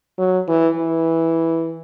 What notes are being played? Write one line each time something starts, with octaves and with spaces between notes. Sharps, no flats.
F#3
E3
E3